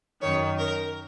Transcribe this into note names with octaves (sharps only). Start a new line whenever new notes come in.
F#2 D#3 C#5
A#4